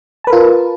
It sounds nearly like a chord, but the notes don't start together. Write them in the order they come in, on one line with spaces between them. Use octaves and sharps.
A5 B4 A#4 F4